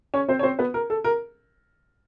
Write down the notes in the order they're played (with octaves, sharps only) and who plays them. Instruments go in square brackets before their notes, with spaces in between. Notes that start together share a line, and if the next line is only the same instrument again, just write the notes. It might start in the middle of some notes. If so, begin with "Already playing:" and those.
[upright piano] C#4 C#5
C4 C5
C#5
C4 C5
B3 B4
A#4
A4
A#4